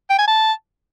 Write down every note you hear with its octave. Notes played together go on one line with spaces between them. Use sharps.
G5
G#5
A5